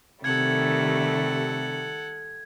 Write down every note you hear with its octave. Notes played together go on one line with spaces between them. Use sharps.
C3 D#3 G3 A3 A4 F#5 G#6